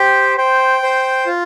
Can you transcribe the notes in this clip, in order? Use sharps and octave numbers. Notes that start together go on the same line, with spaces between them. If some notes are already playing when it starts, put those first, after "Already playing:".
Already playing: G4 C5 G5
C5 G5
C5
F4